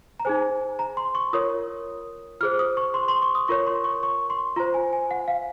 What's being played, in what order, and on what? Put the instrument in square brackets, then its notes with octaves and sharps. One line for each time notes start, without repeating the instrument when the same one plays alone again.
[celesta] A#5
D#4 G#4 C5 G#5
A#5
C6
C#6
F4 A#4 C#5 D#6
F4 G#4 C5 F6
D#6
C#6
C6
C6
C#6
D#6
F4 A#4 C#5 C#6
C6
C#6
C#6
C6
F4 C5 A#5
G#5
G#5
F#5
F5